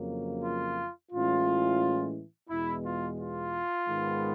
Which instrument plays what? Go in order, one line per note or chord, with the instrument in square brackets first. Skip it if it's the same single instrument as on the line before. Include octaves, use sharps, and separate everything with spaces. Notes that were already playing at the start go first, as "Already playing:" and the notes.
Already playing: [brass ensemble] F2 C#3 F#3 A#3
F4
A2 E3 G#3 C#4 F4
E2 B2 G#3 E4
F4
F4
G#2 D#3 G#3 B3